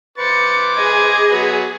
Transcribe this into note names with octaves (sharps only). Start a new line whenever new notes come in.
B4 C5 D6 A6 C#7
G#4 D#5 G#6
F#3 B3 B4